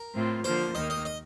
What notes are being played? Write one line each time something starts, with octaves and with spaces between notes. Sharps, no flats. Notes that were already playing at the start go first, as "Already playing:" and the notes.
Already playing: A#4
A2 A3 C4 F4
D3 F3 A#3 F4 C5
D#2 D#3 A#3 D#4 D#5
D#5
D#5